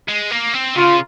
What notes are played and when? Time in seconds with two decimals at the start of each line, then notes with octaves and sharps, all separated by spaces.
0.08 G#3
0.31 A#3
0.54 C4
0.76 C#3 F4